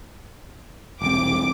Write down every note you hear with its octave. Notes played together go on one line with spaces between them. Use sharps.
E1 C2 C4 D6